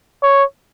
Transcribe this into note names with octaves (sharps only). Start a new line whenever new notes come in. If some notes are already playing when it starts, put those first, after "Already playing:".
C#5